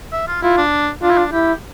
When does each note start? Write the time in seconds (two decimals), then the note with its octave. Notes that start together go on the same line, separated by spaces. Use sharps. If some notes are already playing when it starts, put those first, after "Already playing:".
0.13 E5
0.28 F4
0.42 E4 F4
0.58 D4
1.03 D4 F4
1.11 E4
1.18 D4
1.32 E4 G4